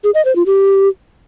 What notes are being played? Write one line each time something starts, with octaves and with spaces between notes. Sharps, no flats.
G#4
D#5
C5
F4
G4